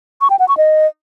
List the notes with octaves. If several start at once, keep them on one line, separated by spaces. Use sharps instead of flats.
C#6
G5
F#5
C#6
D#5